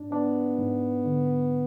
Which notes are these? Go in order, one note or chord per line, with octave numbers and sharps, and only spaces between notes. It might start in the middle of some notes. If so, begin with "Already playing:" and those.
Already playing: G#2 D4
B3 D4
G#2
D3